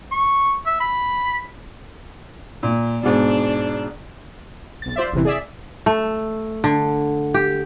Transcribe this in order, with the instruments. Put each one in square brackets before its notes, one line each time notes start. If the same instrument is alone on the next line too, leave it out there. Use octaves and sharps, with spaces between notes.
[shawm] C#6
E5
B5
[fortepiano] A#2
[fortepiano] G#2 B2 [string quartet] D4
[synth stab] B1 A6
F4 C5 D5 E5
G1 E2 C3 E3
G#4 D5 E5
[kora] A3
D3
G4